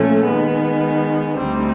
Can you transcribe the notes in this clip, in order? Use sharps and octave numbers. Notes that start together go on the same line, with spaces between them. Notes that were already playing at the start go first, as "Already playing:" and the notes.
Already playing: A#2 F3 A3 C#4
D#3 G#3 B3
D2 D3 G3 C4 D#4